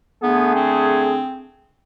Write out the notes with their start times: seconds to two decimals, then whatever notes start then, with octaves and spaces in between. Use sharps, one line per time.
0.23 D3 A3 B3 G#4
0.56 C4